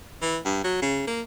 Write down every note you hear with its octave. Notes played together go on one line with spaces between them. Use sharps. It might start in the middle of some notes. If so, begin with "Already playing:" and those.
E3
G2
F#3
C#3
A#3